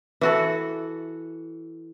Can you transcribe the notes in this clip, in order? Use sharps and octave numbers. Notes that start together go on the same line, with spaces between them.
E3 F#4 A4